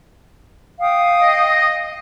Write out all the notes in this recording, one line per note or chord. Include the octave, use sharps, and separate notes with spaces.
F5 G5 D#6
D#5